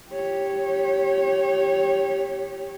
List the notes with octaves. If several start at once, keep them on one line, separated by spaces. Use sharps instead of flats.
G4 C#5